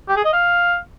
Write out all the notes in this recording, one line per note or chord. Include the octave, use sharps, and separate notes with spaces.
G4
G#4
D#5
F5